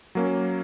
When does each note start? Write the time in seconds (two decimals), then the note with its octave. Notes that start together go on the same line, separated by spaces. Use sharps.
0.15 F#3 A#3 C#4